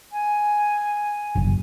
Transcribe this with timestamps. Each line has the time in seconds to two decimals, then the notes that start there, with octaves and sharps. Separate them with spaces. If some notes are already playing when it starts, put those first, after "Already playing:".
0.12 G#5
1.35 F#1